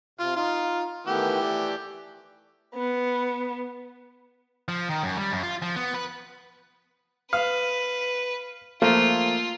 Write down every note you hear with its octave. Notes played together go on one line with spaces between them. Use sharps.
C3 F4 F5
D#4 F4
D#3 E3 A3 B3 G4
A3 D5
B3
F3
D#3
F#2
G3
F#2
F4
F3
B3
B4
B4 F5
F3 A3 A#3 F4